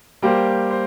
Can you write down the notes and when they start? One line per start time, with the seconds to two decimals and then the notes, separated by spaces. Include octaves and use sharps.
0.22 G3 A#3 G4 C5
0.71 C5